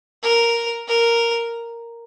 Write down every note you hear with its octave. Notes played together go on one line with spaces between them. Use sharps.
A#4
A#4